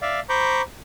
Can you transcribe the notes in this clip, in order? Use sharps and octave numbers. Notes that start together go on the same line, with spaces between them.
D5 E5 F5
C5 A#5 B5 C#6 D6 G6